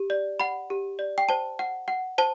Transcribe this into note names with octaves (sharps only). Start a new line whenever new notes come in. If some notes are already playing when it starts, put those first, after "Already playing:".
Already playing: G4
D5
F#5 B5
G4
D5
G5
C5 A5
F#5
F#5
C5 A5